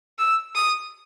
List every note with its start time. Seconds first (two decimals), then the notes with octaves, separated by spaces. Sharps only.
0.19 E6
0.55 D#6